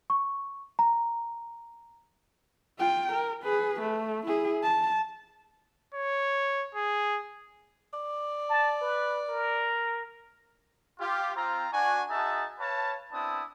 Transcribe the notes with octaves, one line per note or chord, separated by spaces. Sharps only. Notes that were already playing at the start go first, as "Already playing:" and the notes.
C#6
A#5
F4 G5
A#4
G#4 B4
A3
E4 G#4
A5
C#5
G#4
D5
A5
B4
A#4
F4 G4
C4 F4 A#5
D4 F#4 G#5
D#4 F#4 G#4 E5 A5
B4 C#5 F5 A5
B3 C4 D4 E4 A5 D#6